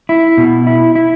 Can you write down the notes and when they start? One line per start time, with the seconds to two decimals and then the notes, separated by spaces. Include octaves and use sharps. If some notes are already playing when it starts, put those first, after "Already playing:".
0.09 E4
0.37 B2
0.67 E4
0.95 E4